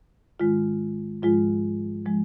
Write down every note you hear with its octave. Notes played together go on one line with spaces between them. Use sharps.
G#2 D#3 G#3 F4
G#2 F3 G#3 F4
F3 G#3